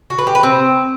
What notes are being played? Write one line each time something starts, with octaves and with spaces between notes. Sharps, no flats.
F#4
B4
G4
B4
C4